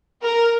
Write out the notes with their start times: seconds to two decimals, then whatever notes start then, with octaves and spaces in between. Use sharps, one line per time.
0.23 A#4